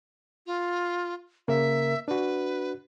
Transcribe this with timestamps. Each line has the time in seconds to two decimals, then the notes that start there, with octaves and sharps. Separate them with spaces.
0.46 F4
1.48 C#3 A#3 A#4 E5
2.08 D4 F#4 B4